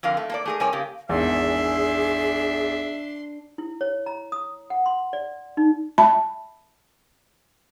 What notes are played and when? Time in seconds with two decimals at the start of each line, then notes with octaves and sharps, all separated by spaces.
0.03 F2 D3 A#4 F5
0.17 A3
0.30 A#3 A4 D5
0.46 A3 G#4 A#4
0.60 C3 G3 A#4 C#5 G#5
0.73 C#3 A#3 G4
1.09 G#1 E2 D4 G#4 E5 C6
3.58 E4
3.81 C#5
4.06 A#5
4.32 D#6
4.70 F#5
4.86 C6
5.13 D5
5.57 D#4
5.98 E5 A5 B5